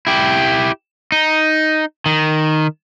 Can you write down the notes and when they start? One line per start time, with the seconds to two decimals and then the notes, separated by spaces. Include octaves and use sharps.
0.07 E4 G4
1.12 D#4
2.06 D#3